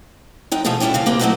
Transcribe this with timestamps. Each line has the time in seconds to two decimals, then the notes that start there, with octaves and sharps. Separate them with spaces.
0.52 F#2 D#4 G5
0.64 B2 F3 A3 D#4 F4 G#4
0.80 G3 C#4 D4 E4 F4
0.94 D#2 G#2 C#3 F5
1.06 A#3 C4 G4 B4
1.19 F#3 A3 C#4 D#4 E4 F#4